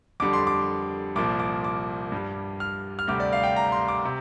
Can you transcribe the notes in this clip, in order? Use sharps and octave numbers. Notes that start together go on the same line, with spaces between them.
F2 D3 G3 D6
C6
D6
C2 A#2 F3 D6
D6
D6
G2 G3
F6
F6
D2 C3 G3 D6
D5
F5
G5
A#5
C6
D6
C3